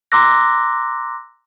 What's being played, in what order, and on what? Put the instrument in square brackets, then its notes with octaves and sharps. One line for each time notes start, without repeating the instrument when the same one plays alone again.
[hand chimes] A#5 C6 D6 E6 F#6 A#6